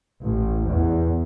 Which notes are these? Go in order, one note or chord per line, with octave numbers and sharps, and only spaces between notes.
A1
E2